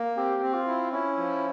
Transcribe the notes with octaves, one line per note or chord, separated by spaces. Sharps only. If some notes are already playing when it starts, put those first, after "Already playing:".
Already playing: A#3
C4 G4
C4
F4
E4
C#4 E4
F3